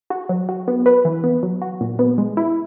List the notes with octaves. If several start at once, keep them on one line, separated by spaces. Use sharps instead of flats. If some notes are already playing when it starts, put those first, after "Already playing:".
F#4
F#3
F#4
B3
B4
E3
B3
F#3
F#4
A#2
B3
G#3
E4